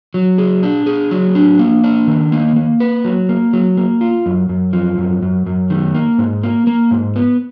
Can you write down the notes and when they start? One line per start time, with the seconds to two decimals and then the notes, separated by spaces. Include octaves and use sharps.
0.14 F#3
0.38 G#4
0.63 D4
0.86 G#4
1.11 F#3
1.35 D4
1.59 A#3
1.84 D4
2.07 D#3
2.32 A#3
2.56 A#3
2.80 B4
3.05 F#3
3.29 A#3
3.53 F#3
3.77 A#3
4.01 F4
4.26 F#2
4.49 F#2
4.73 F3
4.98 F#2
5.22 F#2
5.46 F#2
5.70 D#3
5.95 A#3
6.18 G#2
6.44 A#3
6.67 A#3
6.91 G#2
7.16 B3